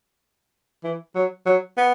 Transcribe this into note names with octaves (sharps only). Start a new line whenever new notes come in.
E3
F#3
F#3
B3